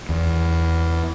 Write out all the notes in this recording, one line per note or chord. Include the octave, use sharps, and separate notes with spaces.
E2